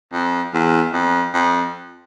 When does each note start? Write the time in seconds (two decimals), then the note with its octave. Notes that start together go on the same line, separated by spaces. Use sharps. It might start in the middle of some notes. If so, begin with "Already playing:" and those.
0.13 F2
0.53 E2
0.93 F2
1.34 F2